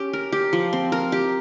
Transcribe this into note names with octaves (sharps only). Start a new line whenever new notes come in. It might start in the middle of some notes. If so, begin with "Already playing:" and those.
Already playing: C#4 G4
A#4
G4
F3
C4
A#4
G4